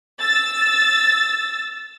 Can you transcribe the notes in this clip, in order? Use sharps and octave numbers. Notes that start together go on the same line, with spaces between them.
E6 A6